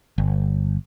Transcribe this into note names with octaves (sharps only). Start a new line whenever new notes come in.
G1